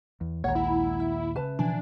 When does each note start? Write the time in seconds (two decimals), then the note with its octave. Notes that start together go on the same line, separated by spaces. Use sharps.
0.21 E2
0.44 A#1 D#2 A#2 G#3 C#5 F#5 A#5
0.55 E4
1.00 E5
1.36 C#3 B4 A5
1.59 B2 E3 F3 D4 G#5